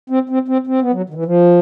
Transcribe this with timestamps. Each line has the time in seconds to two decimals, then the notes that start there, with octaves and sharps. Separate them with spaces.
0.10 C4
0.29 C4
0.48 C4
0.67 C4
0.81 B3
0.92 F#3
1.09 D#3
1.14 E3
1.25 F3